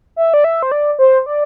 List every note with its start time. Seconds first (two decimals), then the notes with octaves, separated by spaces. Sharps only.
0.16 E5
0.34 D5
0.44 E5
0.63 C5
0.72 D5
0.99 C5
1.26 D5